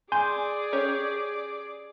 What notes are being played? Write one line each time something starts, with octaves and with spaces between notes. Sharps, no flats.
G#4 D5 G#5 C6 D6 G6
C#4 G4 C#5